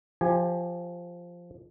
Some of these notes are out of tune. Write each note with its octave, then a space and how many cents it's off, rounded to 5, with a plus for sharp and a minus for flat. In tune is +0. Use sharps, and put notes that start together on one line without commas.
F3 +0 G4 +25 G#5 +0